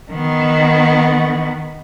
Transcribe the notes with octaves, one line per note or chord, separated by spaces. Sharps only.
D#3 B3